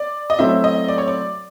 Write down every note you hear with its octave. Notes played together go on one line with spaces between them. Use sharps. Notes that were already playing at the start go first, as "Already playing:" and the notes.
Already playing: D5
D#5
F#3 A3 C4 E4 E5
D#5
D5
C#5
D5